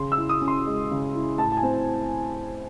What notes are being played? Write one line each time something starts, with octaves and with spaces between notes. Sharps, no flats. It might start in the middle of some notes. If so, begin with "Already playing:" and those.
Already playing: C#3 C6
E6
E4
D#6
C#4
C6
G#3
C#3
E4
A2 A5
A5
G#5
C4